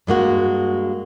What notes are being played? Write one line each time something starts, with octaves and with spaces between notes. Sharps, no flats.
G2 G#3 A#3 F#4